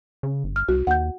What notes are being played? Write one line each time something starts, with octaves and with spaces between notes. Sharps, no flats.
C#3
G1
F6
C2 F#4
D#2 F#5 G6